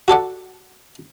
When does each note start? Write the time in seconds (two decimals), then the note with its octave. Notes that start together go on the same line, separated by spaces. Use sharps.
0.08 F#4 A4 D5 F#5